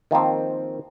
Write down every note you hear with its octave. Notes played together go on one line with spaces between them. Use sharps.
D#3 F3 A#3 C4